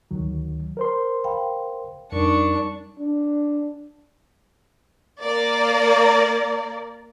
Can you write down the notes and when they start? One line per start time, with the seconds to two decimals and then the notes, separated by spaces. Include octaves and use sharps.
0.11 D2 D#3 F#3
0.77 A#4 C5 C6
1.24 F5 G5 B5
2.12 F2 G3 D4 D#4 A#4 C#6
2.99 D4
5.22 A#3 A#4 D5